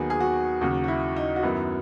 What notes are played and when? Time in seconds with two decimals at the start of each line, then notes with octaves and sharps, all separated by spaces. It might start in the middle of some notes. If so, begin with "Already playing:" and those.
Already playing: D#2 D#3 F#3 B3 G#4
0.10 G#4
0.20 F#4
0.61 D#2 C#3 F#3 F#4
0.84 F#4
0.88 E4
1.16 D#4
1.36 F#4
1.43 F#2 D#3 F#3 B3 E4